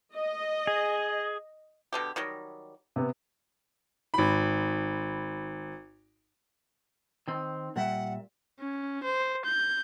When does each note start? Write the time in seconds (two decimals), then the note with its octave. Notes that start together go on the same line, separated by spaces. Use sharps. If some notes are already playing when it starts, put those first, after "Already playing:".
0.15 D#5
0.67 G#4
1.93 B2 D3 G4
2.16 D#3 F#3 G3
2.96 C3 B3
4.14 G#1 B5
7.28 D#3 C4
7.76 A#2 G3 E5 F#5
8.60 C#4
9.03 C5
9.45 G6